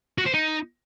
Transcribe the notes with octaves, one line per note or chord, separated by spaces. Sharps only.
F#4
C5
D#4